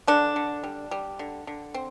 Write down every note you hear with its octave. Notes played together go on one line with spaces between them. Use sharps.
D3 D4
D3
G3
G3
D3
D3
C4